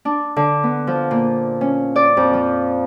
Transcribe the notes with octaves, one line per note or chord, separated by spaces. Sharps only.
D4
D3
B3
F3
A#2
C#4
D5
F2
F3